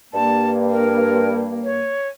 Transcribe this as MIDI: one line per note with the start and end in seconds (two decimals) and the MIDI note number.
0.14 1.81 43
0.14 1.95 58
0.14 0.50 81
0.70 1.35 70
1.64 2.08 73